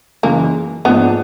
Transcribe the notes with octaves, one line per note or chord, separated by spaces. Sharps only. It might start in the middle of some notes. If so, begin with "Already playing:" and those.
F#2 C#3 E3 G#3 A#3
G#2 F3 A#3 B3 D4